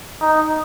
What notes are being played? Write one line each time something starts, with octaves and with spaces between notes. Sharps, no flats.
D#4